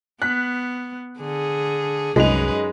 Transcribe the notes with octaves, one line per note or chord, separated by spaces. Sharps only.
B3 F#6 B6
D3 G#4
C2 F#2 G#3 D#4 G#4 B4 F7